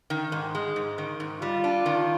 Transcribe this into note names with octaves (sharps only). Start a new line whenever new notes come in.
D#3
G#2
G#3
G#2
D#3
G#2
G3 F4
D4
D#3